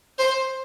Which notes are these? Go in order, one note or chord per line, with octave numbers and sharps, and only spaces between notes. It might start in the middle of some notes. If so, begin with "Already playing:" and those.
C5